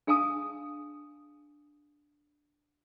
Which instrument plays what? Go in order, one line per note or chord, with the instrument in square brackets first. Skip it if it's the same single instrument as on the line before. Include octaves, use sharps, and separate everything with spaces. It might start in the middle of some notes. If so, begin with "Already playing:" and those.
[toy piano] D4 G#4 F5 G#5 A5 D#6